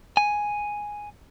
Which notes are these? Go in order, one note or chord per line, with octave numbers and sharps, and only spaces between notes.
G#5